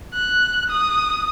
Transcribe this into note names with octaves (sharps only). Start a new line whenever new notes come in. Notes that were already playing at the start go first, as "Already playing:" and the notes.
F#6
D#6